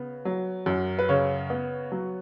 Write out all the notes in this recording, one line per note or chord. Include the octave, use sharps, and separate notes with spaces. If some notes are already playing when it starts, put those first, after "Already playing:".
Already playing: C#3 B3
F#3
F#2
B4
C#3 C#5
B3
F#3